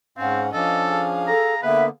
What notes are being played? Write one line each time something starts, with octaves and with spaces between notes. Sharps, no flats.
G#2 C4 C#4 F5 F#5
F3 C#4 D4 A4 D#5 F5
G#4 F5
A4 A#5
D3 A#3 B3 B4 E5